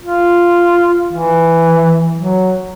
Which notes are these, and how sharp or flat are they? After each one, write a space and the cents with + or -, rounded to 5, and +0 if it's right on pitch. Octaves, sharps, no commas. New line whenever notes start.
F4 -5
E3 +5
F#3 +5